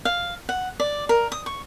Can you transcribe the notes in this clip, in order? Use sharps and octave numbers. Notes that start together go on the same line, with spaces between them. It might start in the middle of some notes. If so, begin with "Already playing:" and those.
F5
F#5
D5
A#4
D#6
C#6